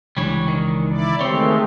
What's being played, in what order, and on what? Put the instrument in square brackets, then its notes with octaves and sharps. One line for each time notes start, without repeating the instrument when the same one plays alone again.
[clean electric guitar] C#2 E3 D4 [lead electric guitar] G3 C#5
[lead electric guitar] D#3
[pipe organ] E4 D5
[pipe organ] D#3 G#3 A3 [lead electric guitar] C4 [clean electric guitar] G4 C#5